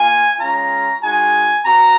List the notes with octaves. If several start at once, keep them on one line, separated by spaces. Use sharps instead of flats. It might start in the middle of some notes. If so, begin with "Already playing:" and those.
Already playing: A#3 F4 G#5
G#3 C#4 F4 A#5
G#3 D#4 F#4 G#5
C4 F#4 A#5